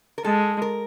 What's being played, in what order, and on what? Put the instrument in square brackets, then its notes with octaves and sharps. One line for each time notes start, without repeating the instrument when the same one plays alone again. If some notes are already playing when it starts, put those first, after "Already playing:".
[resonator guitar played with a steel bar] A#4
[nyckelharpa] G#3 [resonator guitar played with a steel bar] A4
[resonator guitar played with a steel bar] A#4